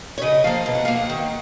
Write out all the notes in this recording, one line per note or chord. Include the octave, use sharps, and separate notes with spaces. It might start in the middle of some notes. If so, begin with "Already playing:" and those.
C#5
C#3 D#5
F3 A#3 F5
B2
F#5
A#3 F5
F#5
D#3